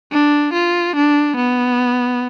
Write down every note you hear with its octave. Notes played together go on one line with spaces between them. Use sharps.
D4
F4
D4
B3